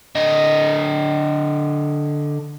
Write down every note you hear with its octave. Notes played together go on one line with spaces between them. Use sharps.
D3 D#5